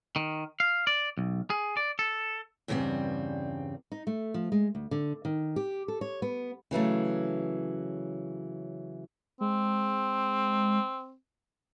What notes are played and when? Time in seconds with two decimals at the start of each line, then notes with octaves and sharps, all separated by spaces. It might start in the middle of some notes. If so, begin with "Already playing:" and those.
0.16 D#3
0.60 F5
0.87 D5
1.18 B1
1.50 G#4
1.77 D5
1.99 A4
2.68 E2 G2 C#3 G3 C4
3.92 D#4
4.07 A3
4.34 F3
4.52 G#3
4.75 D2
4.91 D3
5.25 D#3
5.56 G4
5.88 A4
6.01 C#5
6.22 B3
6.71 C#3 E3 F#3 A3
9.41 G#3 C4